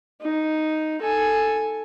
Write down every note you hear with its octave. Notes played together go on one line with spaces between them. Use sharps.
D#4
A4 G#5